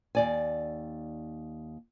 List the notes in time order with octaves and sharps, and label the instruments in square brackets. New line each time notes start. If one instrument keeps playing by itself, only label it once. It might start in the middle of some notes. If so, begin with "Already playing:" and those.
[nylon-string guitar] D#2 D5 G#5